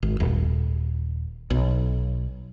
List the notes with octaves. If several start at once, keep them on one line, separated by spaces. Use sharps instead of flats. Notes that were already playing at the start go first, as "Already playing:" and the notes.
G#1
D#1
B1